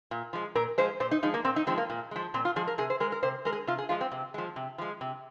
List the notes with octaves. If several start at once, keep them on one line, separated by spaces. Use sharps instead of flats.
A#2
F3 G#3
A#2 A#4
F3 G#3 C5
A#2 C5
D#4
F3 G#3 D#4
A#3
A#2 C4
D#4
F3 G#3 C4
A#3
A#2
F3 G#3
A#2 C4
F4
F3 G#3 G#4
A#4
C3 G#4
C5
G#3 A#4
A#4
C3 C5
G#3 A#4
G#4
C3 F4
G#4
F3 G#3 F4
C4
C3
F3 G#3
C3
F3 G#3
C3